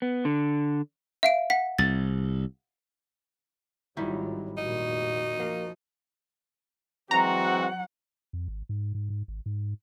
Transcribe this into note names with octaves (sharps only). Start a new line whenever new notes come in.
B3
D3
E5 F5 D7
F#5 B6
C2 A6
G#1 D#3 F#3 G3 E4 F4
F1 A#1 A#2 D#4 F#4
F3 A#3
E3 F#3 G#3 C4 F#4 F#5 A#5
F2
G#1
G#2
G#2
G#2
G#1
G#2